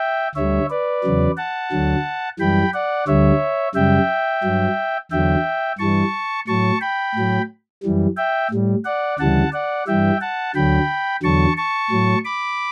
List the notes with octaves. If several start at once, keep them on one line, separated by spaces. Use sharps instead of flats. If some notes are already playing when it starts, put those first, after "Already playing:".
Already playing: E5 G5
D2 D3 G3 C#5 E5
B4 D5
E2 C#3 F#3
F#5 A5
D2 D3 F#3
F#2 E3 G3 G5 B5
D5 F#5
D2 D3 G3 C#5 E5
F#2 C#3 G3 E5 G5
G2 F#3
E2 D3 F#3 E5 G5
G2 E3 G3 A5 C#6
A2 F#3 A5 C#6
G5 B5
A2 F#3
F#2 E3 G3
E5 G5
A2 G3
D5 F#5
D2 C#3 E3 G3 F#5 A5
D5 F#5
G2 E3 G3 E5 G5
F#5 A5
D2 D3 F#3 G5 B5
E2 D3 F#3 A5 C#6
A5 C#6
A2 F#3
B5 D6